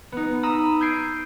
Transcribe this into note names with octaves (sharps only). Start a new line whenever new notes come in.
B3 D#4
A#5 B5 D#6 E6
G6 G#6 C7 D7 D#7